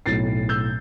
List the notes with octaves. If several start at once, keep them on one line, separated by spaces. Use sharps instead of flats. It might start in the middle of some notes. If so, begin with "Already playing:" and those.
B1 A2 F#3 A6 C7
E6 G6